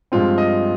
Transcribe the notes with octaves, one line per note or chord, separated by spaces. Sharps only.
G2 F3 G#3 C4 F4
D#5